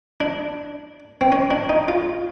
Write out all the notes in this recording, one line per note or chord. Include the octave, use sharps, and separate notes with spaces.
D4
C4
C#4
D4
D#4
F4